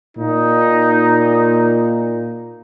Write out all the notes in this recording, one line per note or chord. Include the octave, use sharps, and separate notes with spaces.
A#2 D#4